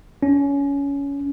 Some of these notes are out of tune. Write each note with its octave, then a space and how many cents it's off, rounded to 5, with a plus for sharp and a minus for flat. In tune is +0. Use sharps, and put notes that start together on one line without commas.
C#4 +20